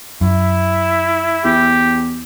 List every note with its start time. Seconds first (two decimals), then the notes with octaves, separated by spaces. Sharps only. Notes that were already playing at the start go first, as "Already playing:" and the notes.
0.21 F#2 E4
1.45 E2 G4